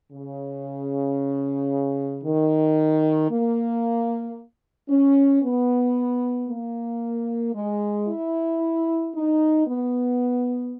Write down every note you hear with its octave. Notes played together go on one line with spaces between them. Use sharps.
C#3
D#3
A#3
C#4
B3
A#3
G#3
E4
D#4
B3